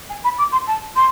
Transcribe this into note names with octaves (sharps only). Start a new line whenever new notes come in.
G#5
B5
D6
C6
A5
C6